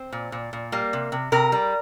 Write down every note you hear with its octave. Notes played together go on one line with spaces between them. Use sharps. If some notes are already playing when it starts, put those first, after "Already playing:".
Already playing: C4
A#2
A#2
A#2
G3 A#3
C3
C3
C3 A#4
G3